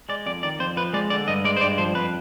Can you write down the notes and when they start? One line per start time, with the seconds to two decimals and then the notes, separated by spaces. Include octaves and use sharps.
0.09 G#3 D5
0.26 F2 D5
0.43 D#3 D5
0.59 F2 C5
0.77 F3 B4
0.93 G#3 D5
1.10 D3 D5
1.28 G2 D#5
1.45 G#3 D5
1.57 C5
1.61 G2 D5
1.78 F3 C5
1.95 F2 B4